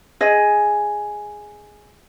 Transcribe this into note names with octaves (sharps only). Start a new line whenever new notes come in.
G#4 D#5